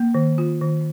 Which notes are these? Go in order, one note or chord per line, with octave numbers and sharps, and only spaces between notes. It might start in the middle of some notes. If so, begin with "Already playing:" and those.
Already playing: A#3
D#3
F4
D#3